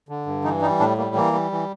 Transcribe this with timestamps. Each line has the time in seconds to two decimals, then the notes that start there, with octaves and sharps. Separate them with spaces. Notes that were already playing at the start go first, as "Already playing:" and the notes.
0.09 D3
0.26 G2
0.44 E3 D#4
0.61 G3 D#4
0.80 A2 D4
0.97 G3 A#3
1.15 E3 A#3
1.33 G3
1.52 E3